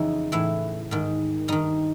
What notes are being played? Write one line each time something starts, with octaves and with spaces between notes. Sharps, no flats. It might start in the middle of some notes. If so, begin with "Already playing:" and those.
Already playing: F2 C#3 E3 D#4
A2 E3 E4
G#2 D#3
G2 D#3 D#4